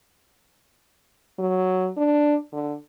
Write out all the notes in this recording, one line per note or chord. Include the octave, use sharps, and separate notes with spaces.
F#3
D4
D3